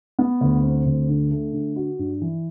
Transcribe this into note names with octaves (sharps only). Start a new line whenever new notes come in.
B3
D2
C4
D2
D3
A3
D3
F#4
G2
E3